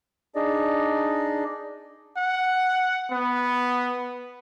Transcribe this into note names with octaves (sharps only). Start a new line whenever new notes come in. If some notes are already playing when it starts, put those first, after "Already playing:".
D4 D#4 G#4 D5 D#5
F#5
B3